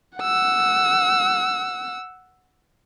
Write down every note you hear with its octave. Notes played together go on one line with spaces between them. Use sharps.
F#5 E6